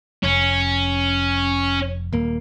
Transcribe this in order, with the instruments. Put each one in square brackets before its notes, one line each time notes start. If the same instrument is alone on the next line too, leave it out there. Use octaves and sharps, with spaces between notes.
[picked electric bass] F1 [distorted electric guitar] C#4
[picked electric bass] D#1 A#3